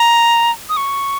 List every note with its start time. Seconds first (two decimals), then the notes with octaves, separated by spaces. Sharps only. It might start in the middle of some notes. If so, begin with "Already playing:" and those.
Already playing: A#5
0.69 D#6
0.77 C#6